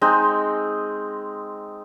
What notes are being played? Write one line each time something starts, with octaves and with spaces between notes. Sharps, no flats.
G#3 C4 D#4